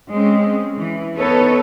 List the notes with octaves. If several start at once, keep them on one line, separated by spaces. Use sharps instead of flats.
G#3 C4 C#4
E3
B3 D#4 A4 B4 C#5